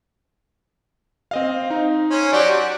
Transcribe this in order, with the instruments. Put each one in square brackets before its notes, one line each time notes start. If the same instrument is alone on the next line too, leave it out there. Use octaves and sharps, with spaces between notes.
[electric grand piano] C4 D#5 F5
D#4
[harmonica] C#4 C5
[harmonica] F#3 G4 [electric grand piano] D5
[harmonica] F#4